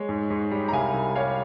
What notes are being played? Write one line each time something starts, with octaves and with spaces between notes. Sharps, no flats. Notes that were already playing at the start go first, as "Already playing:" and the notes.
Already playing: G#3 C#5
G#2
G#2
G3
A#5
C2 F5 G#5
C2
G3 C#5 F5